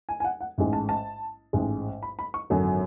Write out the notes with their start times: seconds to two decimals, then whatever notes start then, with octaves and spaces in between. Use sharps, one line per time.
0.09 G#5
0.20 G#5
0.24 F#5
0.41 F#5
0.58 A1 G#2 G#3
0.73 A5
0.89 A5
1.53 A1 G#2 G#3
2.03 B5
2.19 B5
2.34 C#6
2.50 G#1 F#2 D3 F#3